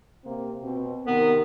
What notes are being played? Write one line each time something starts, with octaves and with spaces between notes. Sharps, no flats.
C3 A#3 C4
B2 C4
C3 D#3 B3 A#4